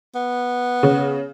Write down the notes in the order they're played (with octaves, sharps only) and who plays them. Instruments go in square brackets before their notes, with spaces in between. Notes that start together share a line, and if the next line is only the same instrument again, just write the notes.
[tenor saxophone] B3
[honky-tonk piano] C#3